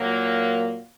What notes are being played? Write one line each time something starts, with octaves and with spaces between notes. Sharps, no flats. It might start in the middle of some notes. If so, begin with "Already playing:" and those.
Already playing: A#2 F#3 A#3